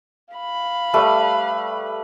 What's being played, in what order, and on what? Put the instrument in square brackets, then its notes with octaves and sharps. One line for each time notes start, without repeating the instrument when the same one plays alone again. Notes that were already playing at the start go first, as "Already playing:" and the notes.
[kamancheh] F5 B5
[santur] G3 A3 B4